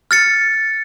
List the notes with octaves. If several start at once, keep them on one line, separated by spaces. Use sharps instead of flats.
F6 A6 C#7